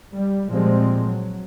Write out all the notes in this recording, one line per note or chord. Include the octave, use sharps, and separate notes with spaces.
G3
A#2 F3 G3 G#3 C4
F#3